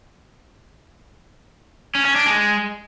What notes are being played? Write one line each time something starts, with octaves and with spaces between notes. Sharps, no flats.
C#4
C#4
D4
G#3